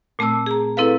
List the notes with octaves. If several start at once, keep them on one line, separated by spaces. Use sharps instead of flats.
A#2 A3 C4 A5 E6
G#4 A#5
C4 E4 A4 B4 F5